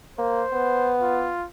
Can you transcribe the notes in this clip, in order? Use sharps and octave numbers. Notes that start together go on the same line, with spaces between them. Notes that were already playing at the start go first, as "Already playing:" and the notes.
A#3 C5
B3
F4